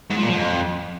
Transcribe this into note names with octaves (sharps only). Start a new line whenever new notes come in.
G#2
F3
A#2
F3
F2